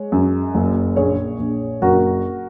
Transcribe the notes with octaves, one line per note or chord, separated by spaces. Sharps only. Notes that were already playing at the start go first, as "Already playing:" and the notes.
Already playing: G#3 C#5
F#2
F#1
A#1 G#4 C#5
A#1
F#1 F#4 A#4